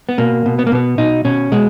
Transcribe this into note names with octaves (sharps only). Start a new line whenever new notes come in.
B3
B2 A#3
B2
B3
A#3
B2 B3
B2 D#4
B2 C#4
B2 G#3